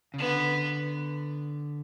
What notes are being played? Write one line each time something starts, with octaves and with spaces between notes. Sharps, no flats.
C#3
D3 B3